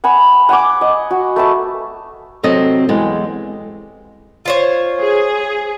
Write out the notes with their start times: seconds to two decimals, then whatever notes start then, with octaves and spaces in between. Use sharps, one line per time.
0.04 F#5 G#5 B5
0.49 F#5 G#5 D6
0.81 D#5
1.10 F#4
1.36 A3 B4 A5
2.43 C3 F#3 C4 A4 D#5
2.89 E2 G#3 G4 A4
4.45 F4 C5 C#5
5.00 G#4